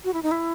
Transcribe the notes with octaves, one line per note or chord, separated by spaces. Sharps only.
F#4
E4
D#4
E4